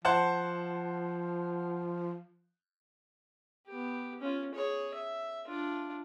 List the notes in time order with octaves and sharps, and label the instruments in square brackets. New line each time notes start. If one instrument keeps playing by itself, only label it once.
[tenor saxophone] F3 [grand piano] C5 F#5 A5
[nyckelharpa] B3 G4
C#4 F4
G#4 C#5
E5
D4 F4